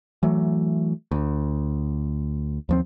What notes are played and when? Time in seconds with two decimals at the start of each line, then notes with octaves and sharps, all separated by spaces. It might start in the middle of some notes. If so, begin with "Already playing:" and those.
0.23 E3 F#3 A3
1.11 D2
2.69 D#2 F3 C4